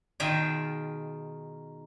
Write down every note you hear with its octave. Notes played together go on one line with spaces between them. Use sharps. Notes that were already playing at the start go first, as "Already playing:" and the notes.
B2 D#3 F4 G#4 E5 G5